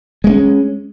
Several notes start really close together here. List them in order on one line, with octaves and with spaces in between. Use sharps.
G#3 A3 C#4